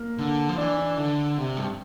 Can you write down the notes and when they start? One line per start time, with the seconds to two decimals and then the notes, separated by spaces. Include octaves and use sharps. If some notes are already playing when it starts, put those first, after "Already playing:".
Already playing: A#3
0.18 D3
0.49 F3
0.58 E3 D4
0.78 D4
0.97 D3
1.38 C3
1.57 G2